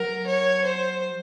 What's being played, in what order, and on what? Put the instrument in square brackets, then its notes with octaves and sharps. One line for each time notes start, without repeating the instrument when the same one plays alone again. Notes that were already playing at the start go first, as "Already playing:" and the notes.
Already playing: [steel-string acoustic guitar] F#3 [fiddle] A#4
[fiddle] C#5
C5